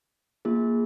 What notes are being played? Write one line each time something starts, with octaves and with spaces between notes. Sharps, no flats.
A#3 F4 G#4